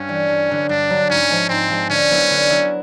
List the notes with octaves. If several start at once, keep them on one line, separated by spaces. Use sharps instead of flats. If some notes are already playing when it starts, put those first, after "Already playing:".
Already playing: G2 C#4
E3 G3
G2
D3 F#3
G2 D4
D3 F#3
G#2 C#4
F3 G#3
G#2 C4
F3 G#3
D3 C#4
F#3 B3 E4
D3
F#3 B3 E4